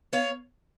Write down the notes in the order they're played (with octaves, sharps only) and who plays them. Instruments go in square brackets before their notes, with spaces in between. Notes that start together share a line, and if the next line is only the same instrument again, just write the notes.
[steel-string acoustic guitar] B3 C#5 F5